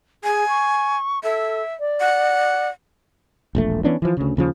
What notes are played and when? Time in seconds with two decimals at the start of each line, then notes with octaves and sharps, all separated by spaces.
0.24 G#4 G#5
0.49 C#6
1.24 A4 E5
1.80 D5
2.00 F#5
3.55 E1 A#1 A3
3.84 E3 B3 C#4 D4
4.02 E3 F3
4.17 D2 C#3
4.37 D#2 C#3 F3